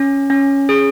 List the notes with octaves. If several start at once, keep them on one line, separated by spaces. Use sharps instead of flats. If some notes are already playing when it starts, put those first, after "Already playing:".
Already playing: C#4
C#4
G#4